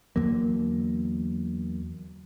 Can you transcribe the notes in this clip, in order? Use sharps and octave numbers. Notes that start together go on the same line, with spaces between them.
E2 D3 F#3 A#3